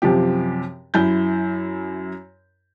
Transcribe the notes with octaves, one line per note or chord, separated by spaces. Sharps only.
F#2 C3 F3 G4
F#2 E4 G6